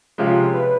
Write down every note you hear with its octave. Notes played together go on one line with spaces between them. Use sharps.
C3 F3 G#3 C#4 F4
B4